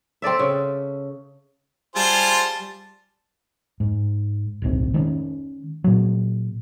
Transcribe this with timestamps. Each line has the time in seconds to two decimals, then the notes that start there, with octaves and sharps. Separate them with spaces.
0.22 C4 A4 D5 E5
0.39 C#3
1.96 G3 F4 G#4 C5 A5
3.80 G#2
4.62 D1 B1 C4
4.94 D#3 G#3 A#3 C#4
5.84 A#2 F#3